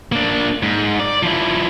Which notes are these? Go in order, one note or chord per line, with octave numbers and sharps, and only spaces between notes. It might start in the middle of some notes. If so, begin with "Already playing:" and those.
A#3 D4
G#2
D5
F3 E4